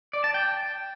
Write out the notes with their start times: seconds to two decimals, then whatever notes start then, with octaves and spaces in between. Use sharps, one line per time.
0.13 D5
0.24 A5
0.34 G5